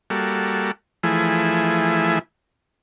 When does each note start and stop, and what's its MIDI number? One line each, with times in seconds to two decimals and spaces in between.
0.10 0.71 55
0.10 0.71 58
0.10 0.71 66
0.10 0.71 69
1.03 2.19 52
1.03 2.19 53
1.03 2.19 57
1.03 2.19 64
1.03 2.19 68